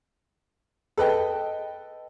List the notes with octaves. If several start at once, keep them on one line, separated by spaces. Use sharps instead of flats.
A4 B4 D#5 G5